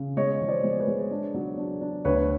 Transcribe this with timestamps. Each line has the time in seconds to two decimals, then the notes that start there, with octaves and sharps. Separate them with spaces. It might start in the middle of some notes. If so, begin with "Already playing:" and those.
Already playing: C#3
0.17 G#3 C#5 D#5
0.41 F3
0.48 C5 D5
0.64 G#3
0.80 B4 C#5
0.87 G#3
1.11 D4
1.35 F#3
1.58 D4
1.81 D4
2.05 D2 B4 C#5